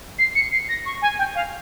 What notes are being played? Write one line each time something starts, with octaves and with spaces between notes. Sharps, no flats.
C7
C#7
C7
A#6
C#6
G#5
G5
F5